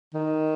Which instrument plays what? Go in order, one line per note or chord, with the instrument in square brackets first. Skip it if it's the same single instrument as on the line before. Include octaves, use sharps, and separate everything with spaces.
[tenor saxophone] D#3